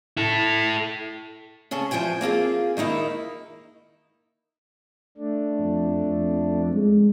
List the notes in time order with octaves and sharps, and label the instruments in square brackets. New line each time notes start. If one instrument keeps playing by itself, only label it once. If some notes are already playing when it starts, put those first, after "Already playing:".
[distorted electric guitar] E4 A4
[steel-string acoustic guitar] C#3 C#4 G#4 A4
E2 F3 C5 G5 G#5
A#3 C4 F4 G#4
D#3 A#3 D#4 E4
[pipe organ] A3 D4
[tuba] F2
F2
G#3